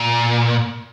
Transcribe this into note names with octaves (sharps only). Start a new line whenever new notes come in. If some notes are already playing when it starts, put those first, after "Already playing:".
Already playing: A#2